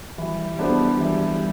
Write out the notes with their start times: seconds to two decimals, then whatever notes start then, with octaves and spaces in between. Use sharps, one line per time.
0.18 E3 G3
0.59 B3 D4 A4 C5
1.00 E3